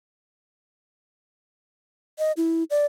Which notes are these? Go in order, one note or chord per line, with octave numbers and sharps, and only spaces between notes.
D#5
E4
D5